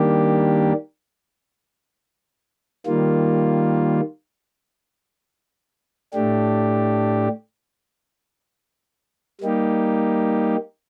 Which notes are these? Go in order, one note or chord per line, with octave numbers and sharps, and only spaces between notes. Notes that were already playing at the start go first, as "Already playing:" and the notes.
Already playing: D#3 G3 A#3 D4 G4
D#3 G3 A#3 F4
A2 A3 D4 G4
G3 A#3 D#4 G4